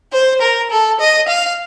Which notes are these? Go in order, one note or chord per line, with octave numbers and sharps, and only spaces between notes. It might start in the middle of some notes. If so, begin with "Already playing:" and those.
C5
A#4
A4
D#5
F5